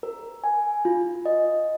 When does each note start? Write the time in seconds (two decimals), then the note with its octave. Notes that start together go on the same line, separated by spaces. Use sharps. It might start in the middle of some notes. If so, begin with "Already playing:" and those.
0.03 A#4
0.44 G#5
0.85 F4
1.26 D#5